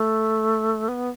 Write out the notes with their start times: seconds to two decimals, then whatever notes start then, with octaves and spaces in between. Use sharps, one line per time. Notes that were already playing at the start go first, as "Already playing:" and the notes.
Already playing: A3
0.88 B3